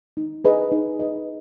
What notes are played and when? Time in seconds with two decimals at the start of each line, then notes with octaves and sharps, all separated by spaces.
0.17 D#4
0.45 G#4 B4 D#5
0.72 D#4
0.99 G#4 B4 D#5